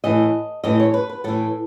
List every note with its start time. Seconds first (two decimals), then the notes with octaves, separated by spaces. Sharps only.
0.04 A2 E3 D#5
0.64 A2 E3 D#5
0.80 C#5
0.94 B4
1.09 B4
1.24 A2 E3 A4